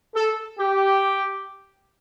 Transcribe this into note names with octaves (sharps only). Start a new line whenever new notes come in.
A4
G4